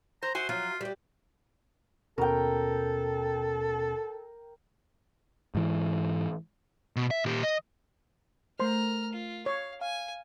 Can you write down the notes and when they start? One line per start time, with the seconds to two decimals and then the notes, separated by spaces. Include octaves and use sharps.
0.23 C5 A#5
0.35 F#4 C5 E5 G#5
0.49 F3 F#3 F4
0.81 G3 G4
2.18 D#2 B2 C#4 A4 A#4 G5
5.55 G#2 E3
6.96 B2
7.11 E5
7.25 A#2 G4
7.43 D#5
8.60 A3 A#4 C5 A#5 C6 F6
9.13 F4
9.46 C#5 F5
9.81 F5 G#5